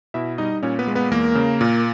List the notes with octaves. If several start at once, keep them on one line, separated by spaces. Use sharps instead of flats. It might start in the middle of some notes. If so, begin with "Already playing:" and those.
B2 E4 E5
G3 D#4 D#5
A#2 C#4 C#5
B3 B4
G#3
B3 B4
E2 A#3 A#4
C#3
A#2